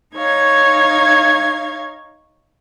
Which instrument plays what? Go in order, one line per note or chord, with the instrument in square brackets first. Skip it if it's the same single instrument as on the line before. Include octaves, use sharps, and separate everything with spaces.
[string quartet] D#4 C#5 F5 G#6